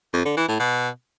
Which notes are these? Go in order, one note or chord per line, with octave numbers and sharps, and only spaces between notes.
F2
D3
E3
A2
B2